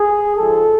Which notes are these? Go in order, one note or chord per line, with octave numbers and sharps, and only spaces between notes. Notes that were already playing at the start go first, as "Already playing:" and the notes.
Already playing: G#4
G#2 F3 G#3 A4